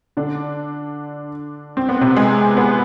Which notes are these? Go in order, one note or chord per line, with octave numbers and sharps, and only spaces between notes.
D3 D4
C4
B3
C3 C4
G#3 G#4
B3 B4